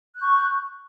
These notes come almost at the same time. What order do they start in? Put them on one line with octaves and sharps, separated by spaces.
F#6 G6 C#6